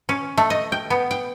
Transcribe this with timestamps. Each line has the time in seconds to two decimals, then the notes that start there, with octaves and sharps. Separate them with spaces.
0.09 C#4
0.38 A3
0.50 D#5
0.72 G5
0.90 B3
1.11 G5